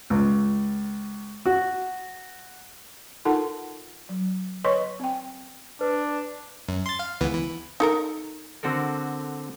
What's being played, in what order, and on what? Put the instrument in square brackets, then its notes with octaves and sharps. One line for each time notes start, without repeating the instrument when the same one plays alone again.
[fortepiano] C#2
F#4
[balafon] D#4 F4 A4 A#4 F#5 A5
F#3
B4 C#5 D#5 C6 C#6
C4 G5
[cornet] D4 [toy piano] B4
[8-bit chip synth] F#2
C6 A6
F5
C#2 E3 B3
E3
[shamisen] D#4 A4 A#4
[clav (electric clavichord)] D3 C4 F#4 A4 A#4